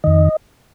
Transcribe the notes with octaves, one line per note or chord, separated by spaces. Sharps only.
F2 D#3 D#5